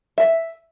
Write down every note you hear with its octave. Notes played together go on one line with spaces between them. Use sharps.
E5